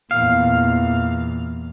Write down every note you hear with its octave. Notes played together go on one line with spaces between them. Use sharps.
E2 A#2 F5